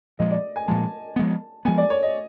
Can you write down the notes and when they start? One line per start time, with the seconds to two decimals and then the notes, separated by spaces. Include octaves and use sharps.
0.19 A#2 F3 G#3 D#5
0.31 D5
0.56 G#5
0.68 A#2 F3 G#3 A5
1.16 F3 G#3 B3
1.65 F3 G#3 B3 G#5
1.78 D5
1.90 C#5
2.03 D#5